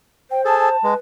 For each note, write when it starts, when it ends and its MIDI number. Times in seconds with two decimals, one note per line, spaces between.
0.31 0.77 72
0.31 0.41 79
0.45 0.69 68
0.45 0.69 69
0.45 0.95 81
0.84 0.94 56
0.84 0.96 71